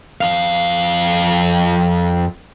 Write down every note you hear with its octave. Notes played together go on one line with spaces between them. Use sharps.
F2 F5